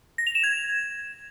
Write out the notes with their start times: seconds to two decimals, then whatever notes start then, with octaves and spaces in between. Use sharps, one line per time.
0.18 A#6
0.27 F7
0.35 E7
0.43 G#6